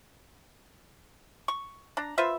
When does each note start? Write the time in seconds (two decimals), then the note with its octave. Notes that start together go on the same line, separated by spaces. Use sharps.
1.48 C#6
1.97 D4 A#5
2.18 F4 B4 C5 E5